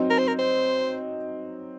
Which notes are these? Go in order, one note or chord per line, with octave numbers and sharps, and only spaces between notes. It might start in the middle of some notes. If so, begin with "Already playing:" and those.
Already playing: F#3 C4 D#4
A#4
C5
A#4
C5